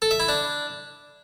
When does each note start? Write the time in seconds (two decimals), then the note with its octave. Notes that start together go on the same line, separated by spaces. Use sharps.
0.02 A4
0.11 E5
0.20 E4
0.29 D4